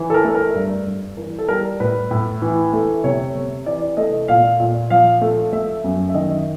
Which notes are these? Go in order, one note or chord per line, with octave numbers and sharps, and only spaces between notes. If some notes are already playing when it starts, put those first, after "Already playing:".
Already playing: E3
A4
A#4
A3
A#4
G2
G2
E3 A#4
A4
G3 A#4
A2 B4
A2
E3
A3
C3 C#5
C3
E3 D5
A3 D#5
A#2 F5
A#2
F3 F5
A3
A3 E5
F#2
E5
D#3 D#5